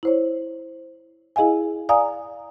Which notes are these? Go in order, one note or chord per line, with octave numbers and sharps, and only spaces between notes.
E4 C5 C#5
E4 G#4 D#5 F5 G#5
D5 F5 G#5 A#5 D#6